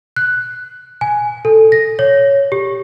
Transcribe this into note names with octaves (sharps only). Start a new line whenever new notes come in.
F#6
G#5
A4
A#6
C#5
G4